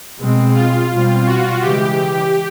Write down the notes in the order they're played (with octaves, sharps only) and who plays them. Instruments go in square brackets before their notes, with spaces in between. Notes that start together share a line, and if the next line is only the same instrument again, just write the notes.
[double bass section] B2 G#3 C4
[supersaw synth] F4
[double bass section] B2 G3 C4
[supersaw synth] F#4
[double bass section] C#3 E3 G#3 [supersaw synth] G4